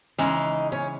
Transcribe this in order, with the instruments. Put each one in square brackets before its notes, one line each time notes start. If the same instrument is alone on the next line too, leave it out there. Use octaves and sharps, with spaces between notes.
[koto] C#3 E3 G#3 [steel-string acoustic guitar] D#4
[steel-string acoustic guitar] C#4